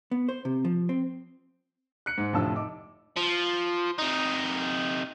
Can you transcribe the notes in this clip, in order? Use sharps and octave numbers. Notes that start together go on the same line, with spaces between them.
B3
C5
C3
F3
C4
F#6 C#7
G#2
F1 A2 D3 F3 A5 E6
D#4 D6
F3
C3 D#4